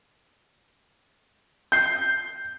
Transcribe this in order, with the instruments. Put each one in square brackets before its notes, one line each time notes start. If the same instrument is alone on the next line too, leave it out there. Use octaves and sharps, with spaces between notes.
[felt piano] G6 C7